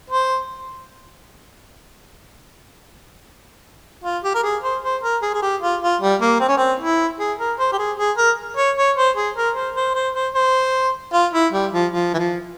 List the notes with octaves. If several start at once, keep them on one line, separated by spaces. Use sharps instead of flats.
C5
F4
G4
A#4
G#4
C5
C5
A#4
G#4
G#4
G4
F4
F4
G3
A#3
C4
C#4
C4
E4
G#4
A#4
C5
G4
G#4
G#4
A#4
C#5
C#5
C5
G#4
A#4
C5
C5
C5
C5
C5
F4
E4
G3
F3
F3
E3
F3